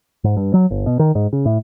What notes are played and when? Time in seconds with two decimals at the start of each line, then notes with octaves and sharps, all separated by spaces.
0.24 G#2
0.37 G2
0.54 F#3
0.71 G1
0.86 B2
0.99 D#3
1.15 G#2
1.33 C#3
1.46 A2